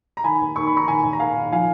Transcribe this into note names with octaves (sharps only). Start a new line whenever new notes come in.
A#5
D#3 G#5 B5
D#2
D#2 C#6
B5
D#3 A#5 C#6
A#5
D#3 G#5 B5
D#2
A#5
D#2 F5 G#5
D#3
F3 F5 G#5